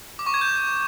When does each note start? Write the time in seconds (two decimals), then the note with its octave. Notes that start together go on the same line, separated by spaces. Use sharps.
0.19 D6
0.27 C#6
0.34 G#6
0.41 G6